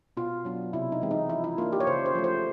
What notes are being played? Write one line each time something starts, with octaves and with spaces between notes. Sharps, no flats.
B2 F4
F#3 B3 D4
C3 E4
D#4
E3 G#3 C4
D#4
F3 E4
E4
A#3 D4 F4
G4
C#5
C#3 C5
C5
F3 A3
C5